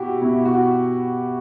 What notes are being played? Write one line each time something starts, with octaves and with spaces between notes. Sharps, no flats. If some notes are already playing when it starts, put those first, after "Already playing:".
Already playing: B2 E4 F#4 G4
B2 E4
F#4